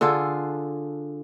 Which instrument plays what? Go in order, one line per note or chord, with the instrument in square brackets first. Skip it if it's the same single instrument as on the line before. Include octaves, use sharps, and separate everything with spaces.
[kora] D3 F4 G#4 A4